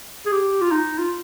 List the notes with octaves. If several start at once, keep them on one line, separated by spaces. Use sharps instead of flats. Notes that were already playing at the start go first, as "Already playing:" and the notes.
G#4
G4
F4
D#4
F4